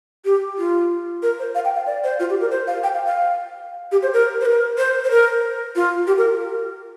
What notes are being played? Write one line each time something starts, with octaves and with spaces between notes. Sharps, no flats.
G4
F4
A#4
C5
F5
G5
F5
D5
C5
F4
G4
A#4
C5
F5
G5
F5
F5
G4
C5
A#4
C5
A#4
C5
C5
A#4
F4
G4
A#4